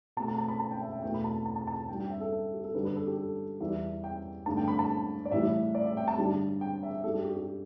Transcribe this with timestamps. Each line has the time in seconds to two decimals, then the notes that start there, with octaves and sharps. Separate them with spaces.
0.17 B2 A5
0.20 A3
0.28 A5
0.38 A5
0.48 B5
0.60 A5
0.71 G5
0.81 E5
0.92 G5
1.02 E2 B2 A3 G5
1.14 B5
1.24 A5
1.46 A5
1.56 A5
1.67 A5
1.88 G2 G3 G5
2.00 G5
2.10 E5
2.21 A4
2.54 G4
2.64 A4
2.74 G2 D3 G3 B4
2.85 B4
2.96 A4
3.07 G4
3.17 A4
3.60 E2 E3 G3 E5
4.04 G5
4.46 G2 D3 A3 A5
4.57 G5
4.68 B5
4.79 A5
5.25 D5
5.31 A2 E3 G3 E5
5.75 D5
5.85 E5
5.97 G5
6.08 A5
6.18 G2 D3 G3
6.61 G5
6.83 E5
7.04 G2 G3 A4
7.14 G4
7.25 G4
7.36 G4